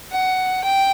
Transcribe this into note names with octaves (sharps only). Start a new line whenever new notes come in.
F#5
G5